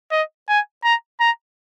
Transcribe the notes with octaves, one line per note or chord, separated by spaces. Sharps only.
D#5
G#5
A#5
A#5